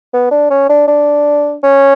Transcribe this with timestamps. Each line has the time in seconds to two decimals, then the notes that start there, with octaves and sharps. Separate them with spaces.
0.13 B3
0.31 D4
0.50 C#4
0.69 D4
0.88 D4
1.63 C#4